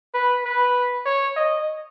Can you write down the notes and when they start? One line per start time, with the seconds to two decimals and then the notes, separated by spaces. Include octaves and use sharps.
0.14 B4
0.45 B4
1.06 C#5
1.36 D#5